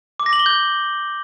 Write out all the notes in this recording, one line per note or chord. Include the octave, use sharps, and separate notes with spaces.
D6
A#6
F#7
G7
G6